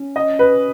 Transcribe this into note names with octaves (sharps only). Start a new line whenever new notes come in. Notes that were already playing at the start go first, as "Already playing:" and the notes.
Already playing: C#4
D#5
B4